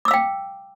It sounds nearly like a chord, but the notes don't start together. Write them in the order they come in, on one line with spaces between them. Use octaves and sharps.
D6 E6 F5 G5